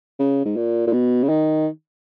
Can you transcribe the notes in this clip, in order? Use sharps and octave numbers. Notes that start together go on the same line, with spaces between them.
C#3
G#2
A#2
A#2
B2
C#3
D#3